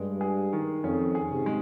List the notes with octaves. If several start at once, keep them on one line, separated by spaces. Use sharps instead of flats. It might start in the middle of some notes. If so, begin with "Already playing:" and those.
Already playing: G2 G#3
G#4
D#3
F2 C#4
G#4
G#2 C3
G#3